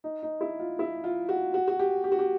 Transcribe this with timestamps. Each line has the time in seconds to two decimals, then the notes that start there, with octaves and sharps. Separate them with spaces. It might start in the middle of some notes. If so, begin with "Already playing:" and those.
0.04 D#4
0.23 D#4
0.41 E4
0.60 F4
0.79 E4
1.04 F4
1.29 F#4
1.54 F#4
1.68 F#4
1.79 G4
2.04 G4
2.12 F#4
2.19 G4